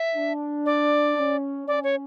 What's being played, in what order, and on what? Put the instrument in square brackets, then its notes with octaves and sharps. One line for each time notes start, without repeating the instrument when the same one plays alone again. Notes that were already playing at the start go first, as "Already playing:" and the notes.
Already playing: [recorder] E5
[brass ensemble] D4
[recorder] D5
[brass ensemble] C#4
[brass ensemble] C#4 [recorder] D5
[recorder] C#5